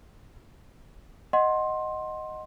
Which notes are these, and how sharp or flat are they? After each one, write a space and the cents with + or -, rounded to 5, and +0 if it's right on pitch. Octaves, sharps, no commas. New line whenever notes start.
D#5 +0 F#5 +0 C6 +15